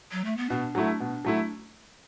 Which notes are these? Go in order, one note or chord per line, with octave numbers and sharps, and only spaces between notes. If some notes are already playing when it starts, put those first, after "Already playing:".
F#3
A3
B3
B2 D4
F#3 A3 E4
B2
F#3 A3 E4